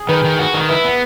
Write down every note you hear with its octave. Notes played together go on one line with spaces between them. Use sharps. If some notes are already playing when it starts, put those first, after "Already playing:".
Already playing: G#4
D#3 B4
D#3
F#4
D#3
E4 B4
B3